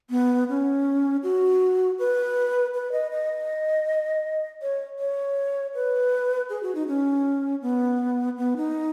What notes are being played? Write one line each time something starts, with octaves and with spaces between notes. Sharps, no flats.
B3
C#4
F#4
B4
B4
D#5
D#5
C#5
C#5
B4
G#4
F#4
D#4
C#4
B3
B3
D#4